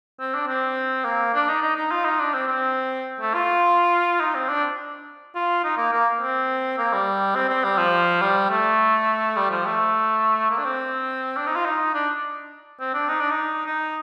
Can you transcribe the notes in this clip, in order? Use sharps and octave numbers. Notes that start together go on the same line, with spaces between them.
C4
D4
C4
A#3
D4
D#4
D#4
D#4
F4
D#4
D4
C4
C4
A3
F4
D#4
C4
D4
F4
D#4
A#3
A#3
C4
A#3
G3
C4
C4
G3
F3
G3
A3
G3
F3
A3
A#3
D4
C4
D4
D#4
F4
D#4
D4
C4
D4
D#4
D4
D#4
D#4